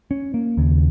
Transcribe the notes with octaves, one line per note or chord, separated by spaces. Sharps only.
C#4
A#3
D#2 C#3